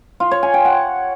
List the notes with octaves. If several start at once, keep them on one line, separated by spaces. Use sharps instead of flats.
F4
C#5
G#5
G5
F#5